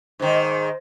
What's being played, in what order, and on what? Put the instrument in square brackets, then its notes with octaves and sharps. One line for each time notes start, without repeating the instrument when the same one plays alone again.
[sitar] G#2 D#3 [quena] C5